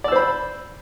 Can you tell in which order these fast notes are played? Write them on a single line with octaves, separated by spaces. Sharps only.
D5 E6 C5 B5